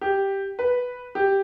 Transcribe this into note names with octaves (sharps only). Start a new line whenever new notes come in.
G4
B4
G4